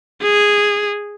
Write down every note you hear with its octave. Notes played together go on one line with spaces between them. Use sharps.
G#4